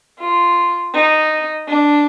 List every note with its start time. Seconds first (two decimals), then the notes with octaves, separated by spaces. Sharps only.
0.19 F4
0.94 D#4
1.67 D4